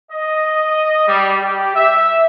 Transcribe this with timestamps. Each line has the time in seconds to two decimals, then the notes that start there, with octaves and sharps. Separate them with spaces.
0.11 D#5
1.08 G3
1.42 G4
1.75 E5